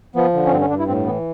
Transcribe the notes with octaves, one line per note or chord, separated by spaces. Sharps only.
F3 B3
D3
C#4
G2 C4
C#4
G2 D4
E4
A2 C4
E3 B3